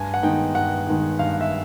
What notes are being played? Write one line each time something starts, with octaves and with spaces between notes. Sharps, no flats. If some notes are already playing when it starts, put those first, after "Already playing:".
Already playing: G2 G#5
F#5
D#3 G#3 B3 D#4 G5
G2 F#5
D#3 G#3 B3 D#4
G2 F5
E5